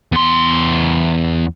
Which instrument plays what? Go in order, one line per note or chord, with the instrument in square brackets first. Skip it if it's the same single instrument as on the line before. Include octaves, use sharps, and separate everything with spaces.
[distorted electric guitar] E2 C6